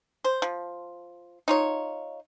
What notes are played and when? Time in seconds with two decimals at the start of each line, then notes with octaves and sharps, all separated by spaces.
0.24 C5
0.42 F3
1.48 D#4 F4 C#5